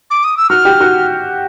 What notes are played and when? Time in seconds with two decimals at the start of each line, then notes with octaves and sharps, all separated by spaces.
0.11 D6
0.24 D#6
0.37 E6
0.50 F#4 F6
0.65 G4
0.81 F#4